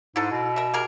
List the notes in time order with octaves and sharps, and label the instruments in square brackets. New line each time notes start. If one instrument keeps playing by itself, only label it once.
[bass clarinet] G#2 [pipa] E4 A4
[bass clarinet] B2
[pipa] A#4 E5
G4 G#4 A#4